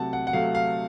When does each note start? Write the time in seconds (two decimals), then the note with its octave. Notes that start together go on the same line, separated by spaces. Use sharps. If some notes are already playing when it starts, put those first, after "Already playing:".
Already playing: C3 F#3 A3 F#5 A5
0.13 F#5
0.27 F#5
0.33 C3 F#3 A3 F5
0.55 F5